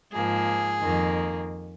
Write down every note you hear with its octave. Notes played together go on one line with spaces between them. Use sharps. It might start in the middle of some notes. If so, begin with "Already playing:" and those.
G#2 F3 A#3 G#4
F2 D#3 A#3